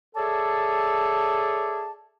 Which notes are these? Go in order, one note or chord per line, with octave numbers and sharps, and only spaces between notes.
G#4 A4 C#5 D5 E5 A5